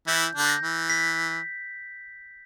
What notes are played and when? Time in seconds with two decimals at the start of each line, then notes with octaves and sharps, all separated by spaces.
0.07 E3 E4 G6
0.35 D3 D4 G6
0.49 A#6
0.62 E3
0.90 B6